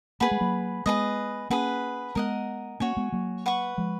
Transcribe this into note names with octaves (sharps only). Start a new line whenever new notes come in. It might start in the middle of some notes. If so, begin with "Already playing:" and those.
A#3 G#4 B4 F#5 B5
G#3
F#3 A#3
G#3 B3 G#4 B4 D#5
A#3 C#4 G#4 B4 F#5
G#3 B3 A#4 D#5 F#5
A#3 C#4 F#4 C#5 G#5
G#3 B3
F#3 A#3
B4 F#5 C#6
F3 G#3